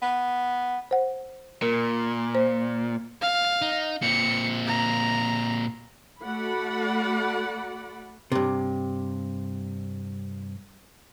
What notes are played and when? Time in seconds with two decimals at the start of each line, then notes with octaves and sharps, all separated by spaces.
0.02 B3
0.91 C5 F#5
1.62 A#2 A#4
2.35 C5
3.21 F5
3.62 D#4
4.02 A#2 C4 C#7
4.67 A#5
6.22 A3 F#4 D5 F#5 B5
8.32 G2 C3